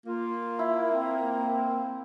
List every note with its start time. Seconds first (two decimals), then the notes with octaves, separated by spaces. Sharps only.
0.06 A#3 F4
0.59 E4 E5 B5
0.91 C4